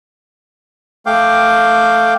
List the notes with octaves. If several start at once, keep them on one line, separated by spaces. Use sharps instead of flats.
A3 F5 G5 D6